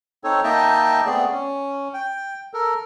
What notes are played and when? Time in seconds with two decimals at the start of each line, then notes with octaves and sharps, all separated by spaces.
0.24 C4 D#4 A4 C#5
0.44 A#3 D#4 D#5 E5 G5 A5
1.06 A3 B3 C4 G#4 D5
1.32 C#4
1.94 G5
2.54 A4 A#4